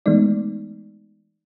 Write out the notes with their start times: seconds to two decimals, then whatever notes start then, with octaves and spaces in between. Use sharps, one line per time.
0.06 E3 G#3 A3 B3 D#4 D5